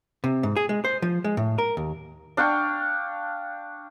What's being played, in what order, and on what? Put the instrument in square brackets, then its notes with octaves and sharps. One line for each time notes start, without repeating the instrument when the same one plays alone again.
[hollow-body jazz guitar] C3
G#2
G#4
G#3
C5
F3
G#3
A2
A#4
D#2
[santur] D4 F5 G5 C#6